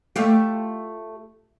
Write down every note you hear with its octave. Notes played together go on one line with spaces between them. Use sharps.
A3 F4 G4